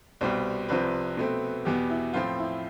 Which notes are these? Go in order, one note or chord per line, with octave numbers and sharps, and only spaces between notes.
C2 B2 G3 C4 C5
C2 C3 F3 C4 B4
B2 A3 C4
E2 B2 B3 G4
E4
A2 F3 C4 F4
E4